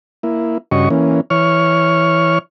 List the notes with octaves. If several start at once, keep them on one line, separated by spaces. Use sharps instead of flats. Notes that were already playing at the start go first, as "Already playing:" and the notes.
A#3 E4
G2 C#3 F#4 D#5 C#6
E3 A#3 C#4
E3 C#5 C#6 F6